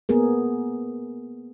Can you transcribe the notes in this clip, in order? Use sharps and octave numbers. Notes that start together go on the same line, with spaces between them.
A#3 B3 G#4 A#4